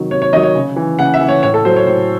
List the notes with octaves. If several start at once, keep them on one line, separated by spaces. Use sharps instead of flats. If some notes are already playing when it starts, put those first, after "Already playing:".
Already playing: C3 D#3 F#3
C3 C#5
C#5
D#3 F#3 D#5
C#5
C#3
E3
C#3 F#5
E5
E3
C#5
A2 C#5
A4
F#3 C5
C#5
A2 C5